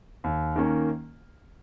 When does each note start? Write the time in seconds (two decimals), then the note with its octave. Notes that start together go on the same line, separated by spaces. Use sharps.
0.24 D#2
0.56 D#3 A#3 C#4